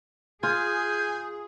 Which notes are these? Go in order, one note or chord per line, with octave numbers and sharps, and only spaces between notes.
F4 G#4 G#5 G6